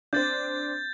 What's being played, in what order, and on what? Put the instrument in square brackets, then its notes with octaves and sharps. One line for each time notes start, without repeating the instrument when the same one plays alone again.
[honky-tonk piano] C4 D4 [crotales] G6 A6